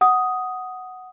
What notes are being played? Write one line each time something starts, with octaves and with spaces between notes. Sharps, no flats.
F#5 D#6